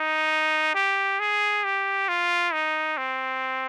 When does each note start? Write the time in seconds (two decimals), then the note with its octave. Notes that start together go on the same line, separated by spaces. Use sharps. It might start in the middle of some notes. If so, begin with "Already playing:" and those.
Already playing: D#4
0.74 G4
1.19 G#4
1.64 G4
2.08 F4
2.53 D#4
2.97 C4